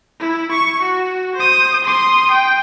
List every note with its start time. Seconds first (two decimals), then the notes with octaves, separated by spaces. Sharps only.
0.20 E4
0.52 C#6
0.83 F#4
1.36 C5 D#6
1.84 C6 D#6
2.31 G5